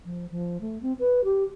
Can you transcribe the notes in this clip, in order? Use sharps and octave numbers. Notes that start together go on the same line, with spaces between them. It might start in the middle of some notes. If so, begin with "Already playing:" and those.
F3
F3
A3
C4
B4
G4